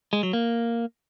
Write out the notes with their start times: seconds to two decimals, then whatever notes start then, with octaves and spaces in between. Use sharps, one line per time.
0.13 G#3
0.23 F#3
0.33 A#3